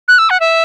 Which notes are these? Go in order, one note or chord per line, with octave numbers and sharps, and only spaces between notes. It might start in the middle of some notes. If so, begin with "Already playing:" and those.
F#6
E6
F#5
E5